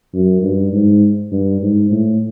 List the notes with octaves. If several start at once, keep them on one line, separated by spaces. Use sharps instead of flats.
F#2
G2
G#2
G2
G#2
A2